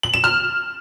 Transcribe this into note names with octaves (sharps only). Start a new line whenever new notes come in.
F#7
E7
F6